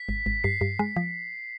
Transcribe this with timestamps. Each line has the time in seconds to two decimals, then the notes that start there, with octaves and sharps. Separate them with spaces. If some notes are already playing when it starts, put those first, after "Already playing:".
Already playing: B6
0.09 G#1
0.26 G#1
0.44 G2 C7
0.61 G2
0.79 G#3
0.96 F3